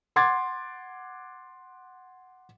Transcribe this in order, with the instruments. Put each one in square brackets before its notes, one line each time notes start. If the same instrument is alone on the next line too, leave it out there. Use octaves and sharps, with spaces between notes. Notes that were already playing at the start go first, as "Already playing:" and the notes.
[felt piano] F#5 C6 D6 G#6 A6